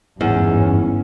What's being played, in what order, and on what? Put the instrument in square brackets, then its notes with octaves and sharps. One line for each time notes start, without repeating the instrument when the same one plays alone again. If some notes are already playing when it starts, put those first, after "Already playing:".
[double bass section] G1 G#2 C#4 [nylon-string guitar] E2